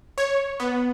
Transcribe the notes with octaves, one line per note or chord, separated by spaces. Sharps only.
C#5
B3